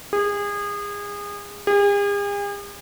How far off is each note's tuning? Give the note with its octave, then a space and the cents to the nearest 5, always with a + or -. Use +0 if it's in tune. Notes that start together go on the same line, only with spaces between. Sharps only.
G#4 -30
G#4 -45